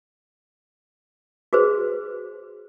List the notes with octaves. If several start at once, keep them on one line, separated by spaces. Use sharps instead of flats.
F#4 G#4 B4 C5